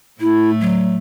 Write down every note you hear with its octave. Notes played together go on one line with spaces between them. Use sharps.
A2 A3 E4
F#3